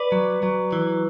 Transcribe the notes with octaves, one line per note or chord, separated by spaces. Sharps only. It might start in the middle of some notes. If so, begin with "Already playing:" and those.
Already playing: B4 D5
F#3
F#3
E3